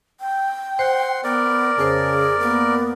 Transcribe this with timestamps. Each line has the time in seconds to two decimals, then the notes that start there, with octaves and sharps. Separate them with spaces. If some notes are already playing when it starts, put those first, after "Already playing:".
0.20 G5
0.79 C5 F#5 C6
1.24 B3 A#4 D5
1.78 F2 C#3 G#4 C5
2.40 A#3 B3